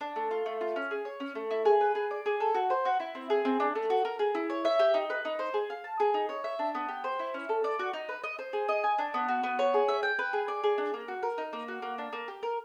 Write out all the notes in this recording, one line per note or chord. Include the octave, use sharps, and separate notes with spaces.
D4
A3
F4
A3
F4
C#4
G#4
C#5
C#4
A3
E4
G#4
B4
G#4
D5
G#4
A4
F#4
C5
F#4
E4
C4
G#4
C4
D4
A3
F#4
A#4
G#4
E4
C#5
E5
G4
D#4
B4
D#4
C5
G#4
F5
A5
G#4
D#4
C#5
E5
D4
B3
G4
C5
E4
C#4
A4
D5
F#4
D#4
B4
D#5
C5
G#4
D#5
G#5
D4
B3
F#4
B3
C#5
G#4
E5
G5
B4
G#4
D5
G#4
D4
A#3
F#4
A#4
D#4
A#3
F#4
A#3
D4
A#3
G4
A#4